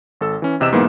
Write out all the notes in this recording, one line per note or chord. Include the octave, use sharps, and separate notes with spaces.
G#1 A4 E6
E3 C#4
E2 C3 G4 D#5 E6 E7
B1 G#2 E3 A#3 B3